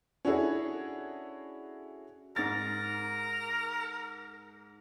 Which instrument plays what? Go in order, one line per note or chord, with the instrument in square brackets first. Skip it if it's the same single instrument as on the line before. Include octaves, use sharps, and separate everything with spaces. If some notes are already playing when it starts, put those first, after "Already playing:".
[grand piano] C#4 D4 E4 F#4 G#4 A4
[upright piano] G#2 A6 [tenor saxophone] A#4